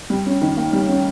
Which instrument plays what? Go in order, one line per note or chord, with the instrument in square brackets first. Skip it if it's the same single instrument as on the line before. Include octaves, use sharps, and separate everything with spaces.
[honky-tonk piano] G3
C#4
D#3
A#3
G3
C#4